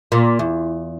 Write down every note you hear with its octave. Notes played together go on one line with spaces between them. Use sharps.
A#2
E2